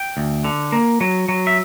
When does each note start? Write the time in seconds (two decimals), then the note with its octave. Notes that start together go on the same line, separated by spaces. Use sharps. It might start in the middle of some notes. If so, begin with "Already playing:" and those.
Already playing: G5
0.17 D2
0.44 D3
0.72 A#3
1.01 F#3
1.29 F#3
1.47 E5